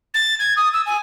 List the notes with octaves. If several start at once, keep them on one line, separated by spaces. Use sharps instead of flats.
A6
G#6
D#6
E6
G#5